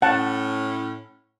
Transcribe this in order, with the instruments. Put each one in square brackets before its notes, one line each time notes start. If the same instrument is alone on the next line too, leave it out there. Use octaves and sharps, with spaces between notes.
[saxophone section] A2 C#4 [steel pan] F#5 A5